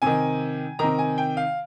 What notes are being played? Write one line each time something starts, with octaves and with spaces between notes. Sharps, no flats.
C3 D#3 G#5
C3 D#3 A#5
G#5
G5
F5